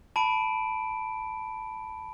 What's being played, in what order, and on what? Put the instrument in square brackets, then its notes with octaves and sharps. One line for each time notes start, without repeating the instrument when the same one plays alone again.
[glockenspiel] A5 B5 D7